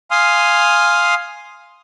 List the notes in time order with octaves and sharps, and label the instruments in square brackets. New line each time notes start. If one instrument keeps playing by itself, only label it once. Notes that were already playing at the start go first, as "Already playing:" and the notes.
[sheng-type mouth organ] F5 G#5 C6 D#6 F6